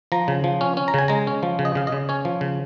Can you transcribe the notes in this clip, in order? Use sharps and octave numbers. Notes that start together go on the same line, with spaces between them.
F3 A#5
C#3
F3
C#4
C#4
A#5
C#3 G#5
G#3 A#5
C#4
F3
C#3
D#5
C#3 F5
D#5
C#3
C#4 C#5
F3
C#3